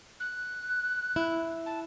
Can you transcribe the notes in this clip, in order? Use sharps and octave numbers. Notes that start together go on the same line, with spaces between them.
F#6
E4
A5